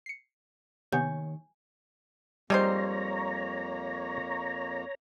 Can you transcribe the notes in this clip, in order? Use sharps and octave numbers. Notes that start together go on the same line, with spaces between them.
C7 C#7
D#2 C3 D#3 B3 C#5 G#5 G6
F2 G3 G#3 A#3 D#4 C5 C#5 A#5